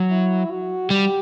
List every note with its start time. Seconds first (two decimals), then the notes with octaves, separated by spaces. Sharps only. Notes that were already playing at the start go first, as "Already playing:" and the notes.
Already playing: F#3
0.10 E4
0.51 F#4
0.90 G3 G4